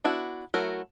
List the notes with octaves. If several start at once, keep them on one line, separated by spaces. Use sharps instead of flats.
B3 D4 E4 F#4
F#3 A3 E4 F#4 A#4